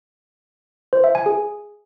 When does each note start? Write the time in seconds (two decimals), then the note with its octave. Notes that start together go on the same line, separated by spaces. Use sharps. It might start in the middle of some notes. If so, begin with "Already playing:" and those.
0.93 C5
1.04 E5
1.15 G#5
1.26 G#4